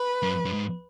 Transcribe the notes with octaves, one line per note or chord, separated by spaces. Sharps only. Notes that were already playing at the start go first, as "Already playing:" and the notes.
Already playing: B4
F#2
F#2
G#2